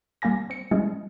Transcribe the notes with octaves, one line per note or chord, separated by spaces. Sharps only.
G3 A#3 F5 G#5 A#6
C4 C#7
F3 G3 G#3 C#4 E4 G#4